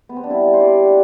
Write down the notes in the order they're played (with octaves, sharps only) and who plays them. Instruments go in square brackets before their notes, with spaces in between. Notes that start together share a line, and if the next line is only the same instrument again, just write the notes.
[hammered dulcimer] B3
C4
D4
G3 E4
C5
G3 D5
F#5